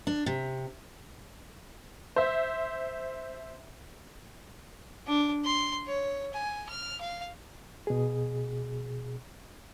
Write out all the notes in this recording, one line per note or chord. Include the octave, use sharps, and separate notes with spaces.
D4
C3
C5 E5
D4
C6
C#5
G#5
F6
F5
B2 G#4